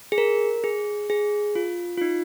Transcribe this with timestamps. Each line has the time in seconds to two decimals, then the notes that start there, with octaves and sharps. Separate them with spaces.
0.12 G#4
0.18 A#4
0.64 G#4
1.10 G#4
1.55 F4
1.97 F4
2.01 D#4